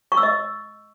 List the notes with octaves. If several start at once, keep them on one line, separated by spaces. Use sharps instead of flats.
C#6
E6
D#5